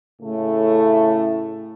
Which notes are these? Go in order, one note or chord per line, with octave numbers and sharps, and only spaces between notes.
A2 C#3 A3